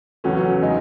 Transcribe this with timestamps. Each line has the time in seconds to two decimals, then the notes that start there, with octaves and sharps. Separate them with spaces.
0.24 E2 C#3 F#3 A3 C#4
0.61 C#3 G#3 D#4